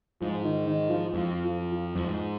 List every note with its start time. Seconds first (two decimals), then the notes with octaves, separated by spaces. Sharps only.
0.21 G#2 F3
0.44 D#3
0.67 D#3
0.90 F3
1.14 F2 F3
1.45 F3
1.72 F3
1.96 F2 F3
2.04 G#2